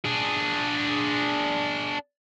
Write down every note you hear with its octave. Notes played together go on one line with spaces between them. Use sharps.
D4 G#4